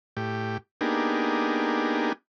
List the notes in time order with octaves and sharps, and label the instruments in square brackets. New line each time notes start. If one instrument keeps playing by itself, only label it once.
[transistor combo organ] A2 G4
A#3 B3 D4 D#4 G4 G#4